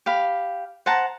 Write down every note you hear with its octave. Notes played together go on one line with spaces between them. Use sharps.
G4 F5 B5
C5 F#5 A5 A#5